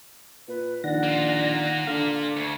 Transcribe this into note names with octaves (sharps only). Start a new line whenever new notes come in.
A#2 B4
A#1 D#3 D5 F#5 A#6
A#3 F4
D3 D4 F5
D2 C#6